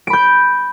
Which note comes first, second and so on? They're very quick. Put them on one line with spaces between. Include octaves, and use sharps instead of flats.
D7 B5 G6